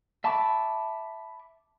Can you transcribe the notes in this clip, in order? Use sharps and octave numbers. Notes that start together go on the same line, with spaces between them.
E5 A5 B5 C#6 D6